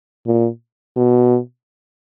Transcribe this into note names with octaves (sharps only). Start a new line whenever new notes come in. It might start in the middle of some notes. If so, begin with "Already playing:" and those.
A#2
B2